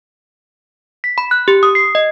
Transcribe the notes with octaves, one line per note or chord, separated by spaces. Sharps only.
B6
B5
F#6
G4
D#6
C7
D#5